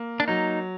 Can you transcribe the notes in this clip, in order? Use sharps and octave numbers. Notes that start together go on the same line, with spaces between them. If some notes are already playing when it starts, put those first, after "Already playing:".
Already playing: A#3
D4
F#3 D#4